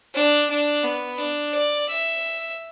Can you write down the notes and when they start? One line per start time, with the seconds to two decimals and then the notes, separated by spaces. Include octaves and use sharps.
0.14 D4
0.50 D4
0.84 B3
1.18 D4
1.53 D5
1.88 E5